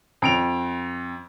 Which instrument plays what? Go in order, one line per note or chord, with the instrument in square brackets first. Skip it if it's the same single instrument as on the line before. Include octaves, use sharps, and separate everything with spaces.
[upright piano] F2 D7 F7